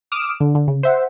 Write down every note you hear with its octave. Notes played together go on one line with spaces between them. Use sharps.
D6 D#6 F6 D7 E7
D3
D3
C#3
C5 E5 F#5